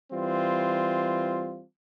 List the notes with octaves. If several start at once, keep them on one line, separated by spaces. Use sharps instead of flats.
E3 G3 C4 F4